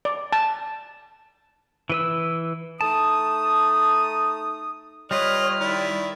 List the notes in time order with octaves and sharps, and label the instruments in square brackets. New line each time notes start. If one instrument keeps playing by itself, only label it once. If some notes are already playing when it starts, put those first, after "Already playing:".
[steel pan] D5
A5
[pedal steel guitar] E3 B4 E6
[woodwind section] A3 D#4 D#6 [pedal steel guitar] A5
[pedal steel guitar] G3 F4 B4 [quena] C#5 [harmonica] D#5 [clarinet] F6
[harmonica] D#3 E4 [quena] D5